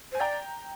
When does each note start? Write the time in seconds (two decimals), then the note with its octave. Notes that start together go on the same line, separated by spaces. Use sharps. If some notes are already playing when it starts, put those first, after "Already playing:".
0.12 C5 G#5
0.20 D5 G5 A#5